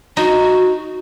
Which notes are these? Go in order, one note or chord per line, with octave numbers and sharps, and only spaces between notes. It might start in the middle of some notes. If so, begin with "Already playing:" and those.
D#4 F#4